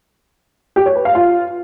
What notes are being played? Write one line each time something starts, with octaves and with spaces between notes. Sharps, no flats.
G4
C#5
B4
F5
F4